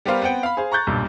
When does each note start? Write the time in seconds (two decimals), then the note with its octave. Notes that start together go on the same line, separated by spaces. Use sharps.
0.05 G3 B3 G4 A#4 C5 F5
0.22 B3 C4 F#5 G5
0.43 F5 B5
0.57 G#4 C5 F5
0.72 A#5 C#6 F#6 G6 A6
0.87 B1 G2 A#2